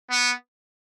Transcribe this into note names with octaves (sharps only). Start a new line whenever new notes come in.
B3